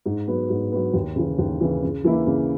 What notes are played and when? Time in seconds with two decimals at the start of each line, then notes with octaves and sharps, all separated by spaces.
0.06 G#2
0.27 F#3 B3
0.50 G#2
0.72 F#3 B3
0.94 D#2
1.16 C#3 E3
1.39 D#2
1.60 C#3 E3
1.83 C#3
2.04 E3 A#3 E4
2.27 C#3